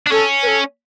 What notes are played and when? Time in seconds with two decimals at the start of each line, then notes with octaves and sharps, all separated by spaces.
0.07 D4
0.11 C#4 A4
0.43 B4
0.47 A4